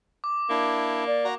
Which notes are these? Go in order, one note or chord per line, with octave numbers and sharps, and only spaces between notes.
D6
A#3 D4 E4
D5
F#4 A#5